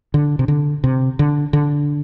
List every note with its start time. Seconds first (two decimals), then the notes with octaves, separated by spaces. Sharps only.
0.14 D3
0.39 C3
0.48 D3
0.84 C3
1.19 D3
1.53 D3